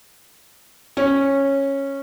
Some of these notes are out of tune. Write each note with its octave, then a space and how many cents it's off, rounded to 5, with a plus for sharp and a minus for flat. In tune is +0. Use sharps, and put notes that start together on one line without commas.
C#4 -10